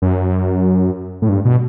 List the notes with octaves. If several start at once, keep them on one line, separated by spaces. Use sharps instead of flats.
F#2
A2
G2
B2